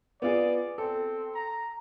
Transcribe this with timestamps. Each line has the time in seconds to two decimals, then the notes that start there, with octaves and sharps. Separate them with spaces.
0.22 B3 F4 G#4 D5
0.78 C4 A4
1.34 A#5